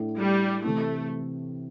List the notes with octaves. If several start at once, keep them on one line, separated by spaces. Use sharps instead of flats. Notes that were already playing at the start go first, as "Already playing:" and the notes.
Already playing: A2 A3 D4
G3
C3 E3 A3 C4 E4